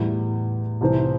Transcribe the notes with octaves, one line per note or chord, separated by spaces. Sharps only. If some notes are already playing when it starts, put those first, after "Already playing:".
Already playing: E2 A2 E3 G3 E4
C2 C3 E3 C4